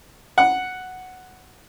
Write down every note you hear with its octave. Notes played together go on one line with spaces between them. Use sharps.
F#5